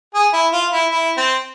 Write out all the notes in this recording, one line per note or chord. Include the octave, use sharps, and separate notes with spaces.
G#4
E4
F4
E4
E4
C4